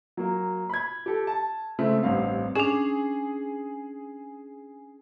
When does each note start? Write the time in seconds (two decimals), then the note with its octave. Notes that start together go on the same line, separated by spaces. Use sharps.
0.17 F#3 A#3
0.69 B5 G#6
1.06 G4 A4
1.27 A5
1.79 C#3 G#3 A3 C4
2.03 A1 G2 C4 F5
2.55 C#4 D4 G#4